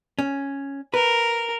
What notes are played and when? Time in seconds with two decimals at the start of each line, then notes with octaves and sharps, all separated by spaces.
0.19 C#4
0.94 A#4 B4